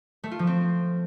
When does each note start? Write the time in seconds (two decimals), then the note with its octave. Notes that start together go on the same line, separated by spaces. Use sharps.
0.24 A3
0.31 F4
0.39 F3
0.47 C4